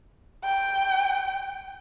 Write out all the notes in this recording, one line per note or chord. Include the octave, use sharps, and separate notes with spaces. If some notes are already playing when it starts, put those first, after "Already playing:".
G5